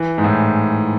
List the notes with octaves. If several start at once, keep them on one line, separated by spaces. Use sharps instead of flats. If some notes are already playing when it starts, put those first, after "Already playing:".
Already playing: E3
G#2
A2